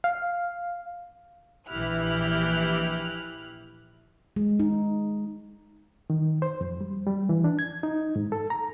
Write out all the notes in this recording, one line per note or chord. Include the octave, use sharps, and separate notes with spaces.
F5
A#1 E3 E4 G4 F6 F#6
G#3
D#4
D#3
C5
F2
G3
G3
E3
D4
G#6
D#4
G#2
A4
A#5